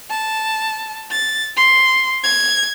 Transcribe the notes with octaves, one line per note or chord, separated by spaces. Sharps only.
A5
A6
C6
G#6